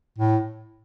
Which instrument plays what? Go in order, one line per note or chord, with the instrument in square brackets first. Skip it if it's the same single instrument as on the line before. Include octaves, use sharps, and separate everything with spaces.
[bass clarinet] A2